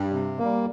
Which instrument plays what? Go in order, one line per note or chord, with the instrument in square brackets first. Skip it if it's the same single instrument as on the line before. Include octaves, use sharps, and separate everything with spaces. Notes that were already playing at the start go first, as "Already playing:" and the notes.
Already playing: [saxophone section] G2
[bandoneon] C3
A#3
G3